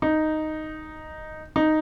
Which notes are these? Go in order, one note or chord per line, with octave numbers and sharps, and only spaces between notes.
D#4
D#4